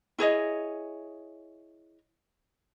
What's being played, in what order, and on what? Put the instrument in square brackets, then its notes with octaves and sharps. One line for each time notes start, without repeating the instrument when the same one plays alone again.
[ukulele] E4 G#4 C#5 D#5